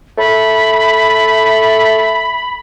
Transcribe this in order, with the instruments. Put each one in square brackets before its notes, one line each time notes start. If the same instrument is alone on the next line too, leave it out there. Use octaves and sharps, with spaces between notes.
[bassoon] A3 [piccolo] B5